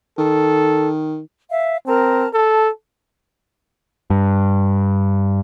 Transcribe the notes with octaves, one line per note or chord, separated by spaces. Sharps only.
D#3 A4
E5 F5
C4 A#4 A5 A#5
A4 A5
G2